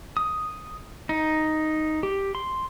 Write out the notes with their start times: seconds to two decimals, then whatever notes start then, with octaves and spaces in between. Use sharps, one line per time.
0.17 D#6
1.09 D#4
2.03 G4
2.35 C6